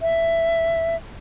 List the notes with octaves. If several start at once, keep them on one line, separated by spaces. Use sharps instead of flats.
E5